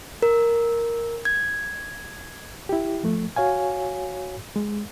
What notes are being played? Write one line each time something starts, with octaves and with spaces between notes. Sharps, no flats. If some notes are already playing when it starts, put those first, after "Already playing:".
A#4
G#6
E4 G4
F3 A3
F#4 C#5 F5 G#5
G#3